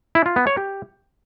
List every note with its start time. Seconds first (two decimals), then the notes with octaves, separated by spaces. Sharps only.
0.15 E4
0.26 F4
0.36 B3
0.47 C#5
0.57 G4